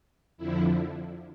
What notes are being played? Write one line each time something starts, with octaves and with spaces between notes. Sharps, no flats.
F2 D3 F3 E4